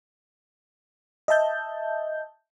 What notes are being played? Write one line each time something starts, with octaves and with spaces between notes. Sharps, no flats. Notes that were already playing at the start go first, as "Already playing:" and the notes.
D#5 E5 A5 G6